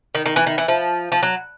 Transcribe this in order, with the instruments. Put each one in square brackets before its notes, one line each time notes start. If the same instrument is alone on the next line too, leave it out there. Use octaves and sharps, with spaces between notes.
[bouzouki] D#3
D#3
E3
D#3
E3
F3
F3
F#3